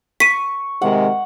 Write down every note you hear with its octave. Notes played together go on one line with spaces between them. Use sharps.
C#6 B6 D#7
C3 D#3 G#3 F#5